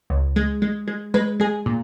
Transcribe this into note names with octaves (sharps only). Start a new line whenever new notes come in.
C#2
G#3
G#3
G#3
G#3 B4
G#3 G#4
A#2